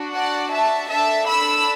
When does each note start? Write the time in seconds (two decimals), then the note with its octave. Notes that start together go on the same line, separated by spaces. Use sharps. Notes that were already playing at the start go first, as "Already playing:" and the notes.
Already playing: D4 F#4
0.14 D5 F#5
0.52 E5 A5
0.90 D4 A4 E5 A5
1.27 B5 E6